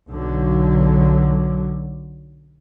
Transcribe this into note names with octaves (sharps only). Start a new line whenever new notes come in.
B1 D3 F#3